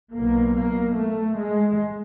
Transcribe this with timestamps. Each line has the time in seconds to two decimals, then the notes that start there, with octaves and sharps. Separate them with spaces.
0.15 B1 B2 A#3
0.57 A#3
0.98 A3
1.40 G#3